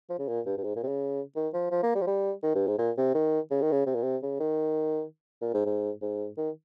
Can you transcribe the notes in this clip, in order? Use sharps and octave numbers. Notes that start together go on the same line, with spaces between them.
F3
C#3
A#2
G2
G2
G#2
A#2
C3
C#3
D#3
F3
F3
A#3
G3
F3
G3
D#3
G2
G#2
A#2
C3
D#3
C#3
D#3
C#3
C3
A#2
C3
C#3
D#3
A#2
G#2
G#2
G#2
D#3